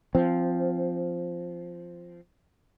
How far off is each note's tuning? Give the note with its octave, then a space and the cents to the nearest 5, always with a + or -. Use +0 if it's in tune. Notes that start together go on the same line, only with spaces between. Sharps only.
F3 -5 C4 +0